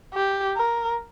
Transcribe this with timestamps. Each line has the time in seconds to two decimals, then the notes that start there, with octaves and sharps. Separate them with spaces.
0.14 G4
0.57 A#4